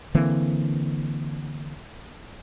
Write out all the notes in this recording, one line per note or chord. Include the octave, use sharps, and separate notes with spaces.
D3 E3 A#3 C4